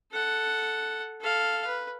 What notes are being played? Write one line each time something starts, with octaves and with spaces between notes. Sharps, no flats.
A4 F#5
A4 F5
B4